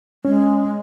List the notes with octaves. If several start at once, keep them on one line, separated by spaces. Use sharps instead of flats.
G#3 C#4